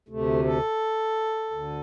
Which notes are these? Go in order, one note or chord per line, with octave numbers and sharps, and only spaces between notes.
D2 C3 A3
A4
D2 D3